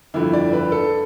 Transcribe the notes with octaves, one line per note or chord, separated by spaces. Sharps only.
G1 F2 D3 E4
D5
B4
A4